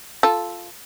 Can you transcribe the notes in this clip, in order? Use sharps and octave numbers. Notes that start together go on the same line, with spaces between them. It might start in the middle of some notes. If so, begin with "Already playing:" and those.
F4 A4